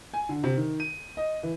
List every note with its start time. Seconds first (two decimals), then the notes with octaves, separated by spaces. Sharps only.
0.14 G#5
0.29 D3
0.44 C3
0.57 D#3
0.80 D#7
1.17 D#5
1.43 E3